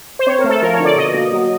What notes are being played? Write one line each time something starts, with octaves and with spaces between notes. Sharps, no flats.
C5
C4 C#5
A#4
A3
A4
F3 A#4
C#5
D3
D5
B2 D#5
A#3
F#3